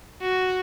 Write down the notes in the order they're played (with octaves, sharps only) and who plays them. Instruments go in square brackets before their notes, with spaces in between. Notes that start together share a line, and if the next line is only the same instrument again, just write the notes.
[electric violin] F#4